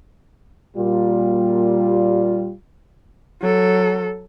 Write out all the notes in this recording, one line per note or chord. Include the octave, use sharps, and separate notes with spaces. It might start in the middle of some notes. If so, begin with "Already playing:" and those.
A#2 G3 F4
F#3 A4